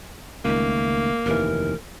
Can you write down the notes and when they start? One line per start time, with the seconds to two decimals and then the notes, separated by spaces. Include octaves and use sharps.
0.45 C#2 D#3 A3 A#3
1.26 F1 D#2 E3 A#4